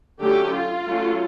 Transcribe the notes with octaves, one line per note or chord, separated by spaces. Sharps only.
D3 F#3 A3 C#4 G4
F4
F#3 A3 C#4